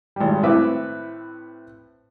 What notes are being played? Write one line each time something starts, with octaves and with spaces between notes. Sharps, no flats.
G#1 G3
A2 C4 B4 E5 D6